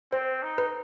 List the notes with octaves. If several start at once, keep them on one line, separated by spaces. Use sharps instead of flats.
C4 C5
D#4
B4